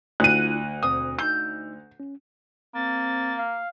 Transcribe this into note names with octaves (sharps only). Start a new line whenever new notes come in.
D2 D4 E4 F4 F#6 D#7
D#2 B2 C4 D#6
D#4 E6 G6
C#4
A#3 C4 A6
F5